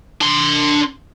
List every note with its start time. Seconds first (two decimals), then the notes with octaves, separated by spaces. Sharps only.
0.21 D4 C6